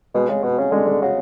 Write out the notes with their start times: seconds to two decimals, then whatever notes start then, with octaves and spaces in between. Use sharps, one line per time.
0.14 B2 G#3
0.29 C#3 G#3
0.43 B2 F#4
0.58 C#3 C#4
0.72 D3 G#3
0.87 G#3
1.02 C#3 F#4